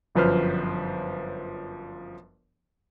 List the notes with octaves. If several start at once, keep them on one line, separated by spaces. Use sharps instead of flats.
G1 F#2 F3 B4 C5 F6